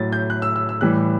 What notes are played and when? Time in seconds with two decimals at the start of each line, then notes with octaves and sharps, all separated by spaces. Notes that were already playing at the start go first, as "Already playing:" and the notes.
Already playing: A2 F#3 A6
0.12 G6
0.30 F#6
0.42 E6
0.56 E6
0.69 E6
0.81 A2 E3 G3 F#6